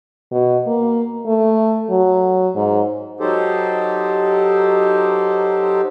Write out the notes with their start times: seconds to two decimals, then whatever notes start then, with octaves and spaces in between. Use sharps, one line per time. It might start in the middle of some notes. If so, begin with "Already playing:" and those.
0.32 B2
0.67 A#3
1.27 A3
1.90 F#3
2.55 G#2
3.20 F#3 D#4 G4 A4 C5